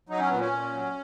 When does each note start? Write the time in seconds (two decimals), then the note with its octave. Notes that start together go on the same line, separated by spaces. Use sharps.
0.09 F#3 D#4
0.19 C#4
0.29 A#2 B3
0.40 C#4
0.52 A#2
0.73 F#3